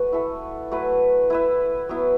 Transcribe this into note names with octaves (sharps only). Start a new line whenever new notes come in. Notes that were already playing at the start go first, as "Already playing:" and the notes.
Already playing: A3 F#4 B4
E4 A4 E5
F#3 A3 E4 B4
E4 B4 E5
F#3 B3 E4